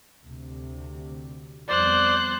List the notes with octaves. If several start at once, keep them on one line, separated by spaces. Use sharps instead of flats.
D2 C3
F2 G3 B3 C5 D5 F#6